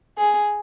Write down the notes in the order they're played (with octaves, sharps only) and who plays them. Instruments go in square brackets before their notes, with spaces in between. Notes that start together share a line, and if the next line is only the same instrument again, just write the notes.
[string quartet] G#4